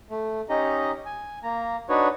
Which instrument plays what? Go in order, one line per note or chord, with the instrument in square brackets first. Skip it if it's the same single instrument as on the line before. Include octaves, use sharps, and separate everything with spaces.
[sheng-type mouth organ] A3
C#4 D#4 G4 D#5 A#5
G#5
A#3 A#5
D4 D#4 F#4 B4 C#5